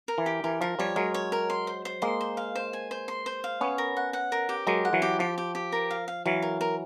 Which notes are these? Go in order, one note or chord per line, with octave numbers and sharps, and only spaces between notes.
A#4
E3
G4
E3 A#4
F3 A#4
F3 G3 C#5
F#3 G#3 A#4
C#5
A#4
C6
C5
C5
G#3 A#3 C6
C5
F5
C5
G#5
C5
C6
C5
F5
B3 C#4 C#5
A#4
F#5
F#5
A#4
G4
F#3 G#3 A#4
F#5
E3 F#3
G4
F3 G4
G4
G4
A#4
F5
F5
E3 F#3 F5
A#4
A#4